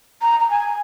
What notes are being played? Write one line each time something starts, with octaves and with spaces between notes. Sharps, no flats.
A#5
A#5
G#5